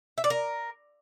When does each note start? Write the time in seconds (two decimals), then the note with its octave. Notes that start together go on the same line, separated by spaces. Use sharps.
0.18 E5
0.24 D5
0.30 A#4